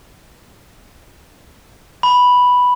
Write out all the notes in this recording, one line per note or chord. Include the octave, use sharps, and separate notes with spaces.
B5